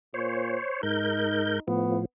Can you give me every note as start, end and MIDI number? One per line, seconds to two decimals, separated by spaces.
0.14 0.58 46
0.14 0.82 72
0.14 0.82 73
0.83 1.60 44
0.83 1.58 63
0.83 1.60 70
0.83 1.60 91
1.68 2.05 45
1.68 2.05 53
1.68 1.98 59